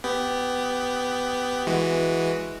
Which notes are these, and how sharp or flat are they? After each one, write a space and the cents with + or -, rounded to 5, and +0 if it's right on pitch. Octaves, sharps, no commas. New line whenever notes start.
B3 +15 G4 +0
E3 +0 G#3 +0 F#4 +0